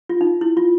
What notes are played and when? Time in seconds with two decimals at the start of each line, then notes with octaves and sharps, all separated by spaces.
0.09 F4
0.21 D#4
0.41 E4
0.57 F4